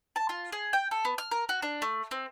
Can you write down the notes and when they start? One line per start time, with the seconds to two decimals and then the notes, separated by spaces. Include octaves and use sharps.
0.16 A5
0.29 F4
0.52 G#4
0.73 G5
0.91 A4
1.05 B3
1.18 F6
1.31 A#4
1.49 F#4
1.62 D4
1.82 A3
2.11 C4